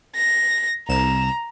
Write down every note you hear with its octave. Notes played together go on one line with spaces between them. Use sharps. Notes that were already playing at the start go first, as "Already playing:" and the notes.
A#6
C2 A#5 E7